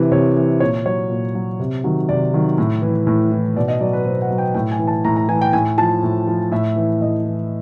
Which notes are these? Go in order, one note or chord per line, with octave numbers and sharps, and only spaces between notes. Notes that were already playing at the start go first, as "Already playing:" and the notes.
Already playing: C3 E3
C3 C#5
E3
A#2 C#5
F#3 C#5
A#2
F#3
C3
D#3 F#3
C3 D5
D#3 F#3
A2
E3
A2
E3
B2 D5
D#5
F#3 D5
B4
B2 C5
F#5
F#3
G5
A2 G5
G#5
E3
A5
A2 A#5
A#5
E3 G#5
G5
A2 G#5
F3 A5
A2
F3
A2 E5
E3
A2 D#5
E3